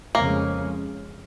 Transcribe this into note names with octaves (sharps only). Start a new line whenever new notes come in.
F2 C#3 G#3 A#3 C#4